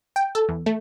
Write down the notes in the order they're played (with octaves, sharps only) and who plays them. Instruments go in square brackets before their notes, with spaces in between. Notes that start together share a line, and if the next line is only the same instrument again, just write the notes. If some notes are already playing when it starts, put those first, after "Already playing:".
[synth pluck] G5
A4
E2
A3